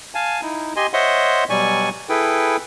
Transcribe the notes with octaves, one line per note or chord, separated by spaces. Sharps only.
F5 G#5 A5
D#4 E4
G4 D#5 G#5 C6
C5 C#5 D#5 E5 F#5 C6
B2 F#3 G3 D5 G#5 C#6
E4 G#4 A4 B4 G5